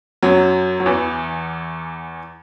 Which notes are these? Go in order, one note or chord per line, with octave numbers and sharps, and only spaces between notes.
F#2 F#3
F#3
E2 E3